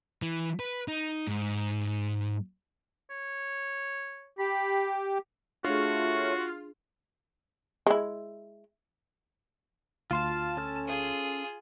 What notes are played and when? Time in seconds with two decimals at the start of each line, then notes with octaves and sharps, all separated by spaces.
0.22 E3
0.59 B4
0.88 D#4
1.27 G#2
3.10 C#5
4.39 G4 B5
5.64 A3 D4 F4 F#4 G#4 C#5
7.87 G#3 E4
10.11 D2 F4 F5 A5 C6
10.57 C#4 A4 F6
10.87 F4 G#4